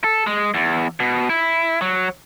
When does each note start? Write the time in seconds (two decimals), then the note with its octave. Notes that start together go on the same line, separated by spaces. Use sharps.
0.04 A4
0.27 G#3
0.54 E2
1.00 B2
1.30 E4
1.81 F#3